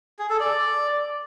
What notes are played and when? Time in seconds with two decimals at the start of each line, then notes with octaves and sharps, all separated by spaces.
0.19 G#4
0.30 A4
0.40 D5